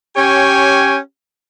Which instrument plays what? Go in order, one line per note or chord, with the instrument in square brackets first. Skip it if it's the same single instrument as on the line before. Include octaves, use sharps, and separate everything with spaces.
[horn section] C#4 G4 C#5 G5 G#5